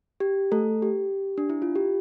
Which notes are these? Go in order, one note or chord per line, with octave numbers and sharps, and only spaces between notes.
G4
A3 A4
G4
D4
E4
F4
G4